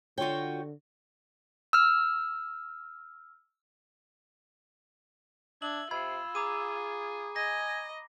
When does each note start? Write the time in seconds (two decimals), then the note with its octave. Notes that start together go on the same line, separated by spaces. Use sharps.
0.18 D3 F4 F#4 G#4 C#5 G5
1.73 E6 F6
5.62 D4 E5 G#6 F#7
5.91 C3 F4 B5 E6 G#6
6.35 G#4 A#5 D6 D#7
7.36 D#5 G#5 A#6